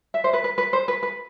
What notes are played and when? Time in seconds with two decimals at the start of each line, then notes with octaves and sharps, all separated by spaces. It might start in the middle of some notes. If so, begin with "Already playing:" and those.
0.14 E5
0.24 C5
0.33 B4
0.44 B4
0.58 B4
0.73 C5
0.88 B4
1.03 B4